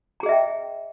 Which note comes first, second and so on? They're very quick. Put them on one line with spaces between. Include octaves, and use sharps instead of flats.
A#5 G#4 D#5 E5 G5